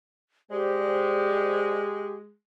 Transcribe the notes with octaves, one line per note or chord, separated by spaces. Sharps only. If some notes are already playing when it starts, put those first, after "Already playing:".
G#3 G4 C5 D5